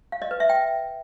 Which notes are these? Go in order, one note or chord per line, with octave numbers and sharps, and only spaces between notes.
F5
D#5
B4
E5
G5